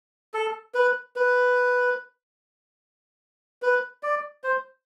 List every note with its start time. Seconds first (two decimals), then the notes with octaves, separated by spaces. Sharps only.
0.34 A4
0.74 B4
1.16 B4
3.62 B4
4.03 D5
4.44 C5